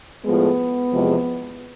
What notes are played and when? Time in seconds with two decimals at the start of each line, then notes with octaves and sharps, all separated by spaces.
0.24 A2 F3 G#3 B3
0.92 E2 C3 F3 G#3